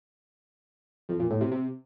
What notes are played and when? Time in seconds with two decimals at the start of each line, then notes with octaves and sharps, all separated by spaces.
1.09 F2
1.20 A#2
1.30 A2
1.41 C3
1.51 C3